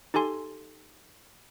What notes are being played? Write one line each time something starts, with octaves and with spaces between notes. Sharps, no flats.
D#4 G4 A4 G#5 C6